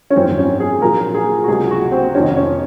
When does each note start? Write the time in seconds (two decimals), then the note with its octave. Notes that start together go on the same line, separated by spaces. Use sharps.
0.10 C#4
0.16 G#1 F#2 F3 C4
0.38 C#4
0.60 G#4
0.81 A#1 A#2 F#3 A#4
1.14 G#4
1.44 F#4
1.48 C#2 C3 F#3 G#4
1.71 F#4
1.92 C4
2.15 F1 F2 D#3 C#4
2.36 C#4